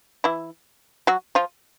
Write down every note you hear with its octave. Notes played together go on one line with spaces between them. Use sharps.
E3 E4
F#3 F#4
F3 F4